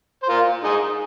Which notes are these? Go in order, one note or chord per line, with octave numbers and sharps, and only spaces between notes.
C5
F4 A#4
D#4 G#4